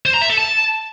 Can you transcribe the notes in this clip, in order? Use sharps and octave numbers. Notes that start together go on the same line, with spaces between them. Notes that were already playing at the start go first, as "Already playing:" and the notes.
C5
A#5
E5
A4
A5